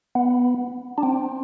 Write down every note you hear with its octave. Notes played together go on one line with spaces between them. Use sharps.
B3
D4
C4